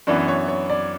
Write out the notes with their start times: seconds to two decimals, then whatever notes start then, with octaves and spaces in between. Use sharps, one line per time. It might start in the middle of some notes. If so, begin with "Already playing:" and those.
0.07 F#2 E3 B3 D4
0.28 C#5
0.48 C#5
0.70 D5